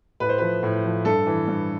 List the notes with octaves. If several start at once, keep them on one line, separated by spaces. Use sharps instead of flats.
A2 B4
C5
F3 B4
A2
F3
G2 A4
E3
G2